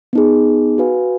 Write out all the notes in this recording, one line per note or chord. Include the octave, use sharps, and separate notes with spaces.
B3 D#4 G#4
F#4 B4 F5 G#5